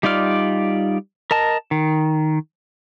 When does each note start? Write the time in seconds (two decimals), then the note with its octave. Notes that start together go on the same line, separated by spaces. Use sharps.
0.03 G3 D#4 F4 D5 F6
1.31 A#4 D#5 A5
1.71 D#3